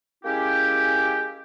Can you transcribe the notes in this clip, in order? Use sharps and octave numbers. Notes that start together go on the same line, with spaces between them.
G#3 A#3 C#4 E4 G4